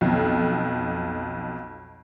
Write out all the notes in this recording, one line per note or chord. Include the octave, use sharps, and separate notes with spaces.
B1 F2